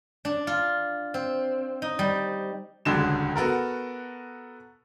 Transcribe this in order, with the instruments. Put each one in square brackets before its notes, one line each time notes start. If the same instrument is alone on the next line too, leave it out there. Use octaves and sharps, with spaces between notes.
[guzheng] D4
F4
C4
D#4
G3
[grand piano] D#1 C#2 D3 F#3 G#3 E7
B3 F#4 A4 A#4